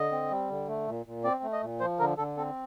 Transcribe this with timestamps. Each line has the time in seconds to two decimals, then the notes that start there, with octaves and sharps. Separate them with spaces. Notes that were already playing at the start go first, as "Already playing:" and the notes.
Already playing: D3 D#5
0.12 C4
0.30 G3
0.50 D3
0.68 A3
0.87 A#2
1.06 A#2
1.24 C4 D5
1.43 A3
1.53 D#5
1.62 A#2
1.80 F3 C5
2.00 D3 A#4
2.18 D3 A4
2.37 C4 A4